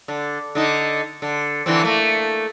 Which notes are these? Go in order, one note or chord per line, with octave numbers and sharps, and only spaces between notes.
D3
D3 D#4
D3
D3 E3 C4
A3 A#3